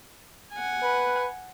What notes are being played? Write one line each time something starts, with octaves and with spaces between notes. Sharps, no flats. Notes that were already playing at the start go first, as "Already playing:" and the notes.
F#5 G#5
B4